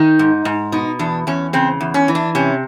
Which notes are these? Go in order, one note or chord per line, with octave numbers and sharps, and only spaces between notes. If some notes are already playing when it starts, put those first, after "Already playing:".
Already playing: D#3 D#4
G#2
G#2
B2 D#4
E2 D4
E2 C#4
C#3 C4
E2
C#4
E3
D4
C3 C#4